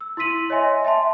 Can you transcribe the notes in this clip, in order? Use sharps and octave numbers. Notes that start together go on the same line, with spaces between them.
E6
E4 C6 E6 B6 D#7 F#7
C#5 D#5 E5 G#5 C6 A#6
E5 G5 A5 C6